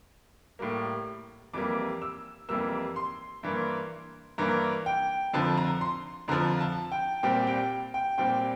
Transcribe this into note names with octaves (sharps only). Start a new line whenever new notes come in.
A2 G3 A#3
F2 E3 G3 A#3 D6
E6
F2 E3 G3 A#3 E6
C6
G2 E3 A#3
G2 E3 A#3 A#5
G5
F2 D3 F3 A5
A#5
C6
F2 D3 F3 A#5
A5
G5
A#2 G3 C4 G5
G5
G5
A#2 G3 C4 G5